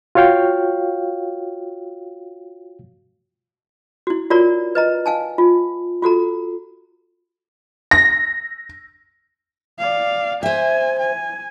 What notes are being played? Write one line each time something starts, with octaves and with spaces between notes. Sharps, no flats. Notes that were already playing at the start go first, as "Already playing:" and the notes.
F4 F#4 C#5 F5 G5
E4 F#4
F4 F#4 A#4 C#5 D5 A#5
B4 D#5 A#5
F5 G#5 A5
F4
F4 F#4 A4 A#5
A#6
D5 F5
C5 E5 G#5
G#5